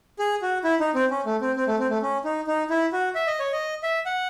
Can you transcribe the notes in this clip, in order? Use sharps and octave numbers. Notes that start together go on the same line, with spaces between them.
G#4
F#4
E4
D#4
C4
C#4
A3
C4
C4
A3
C4
A3
C#4
D#4
D#4
E4
F#4
E5
D#5
C#5
D#5
E5
F#5